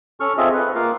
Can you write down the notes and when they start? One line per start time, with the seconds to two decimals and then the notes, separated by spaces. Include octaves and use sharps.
0.20 C#4 A4 C#6 F6
0.37 C4 F4 G#4 A4 D#5 E5
0.53 A4 B4
0.75 A#3 F4 A#4 F5